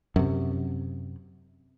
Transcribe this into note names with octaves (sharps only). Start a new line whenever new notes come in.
F#2 C3